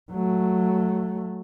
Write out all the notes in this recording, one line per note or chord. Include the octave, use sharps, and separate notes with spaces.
F#3 A3